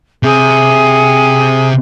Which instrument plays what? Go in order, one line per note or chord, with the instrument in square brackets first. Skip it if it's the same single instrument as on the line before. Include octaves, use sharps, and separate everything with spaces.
[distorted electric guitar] C3 [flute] G#4